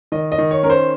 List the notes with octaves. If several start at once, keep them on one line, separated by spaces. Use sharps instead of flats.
D#3 D#5
D#5
D#3
C#5
C#4 A#4
C5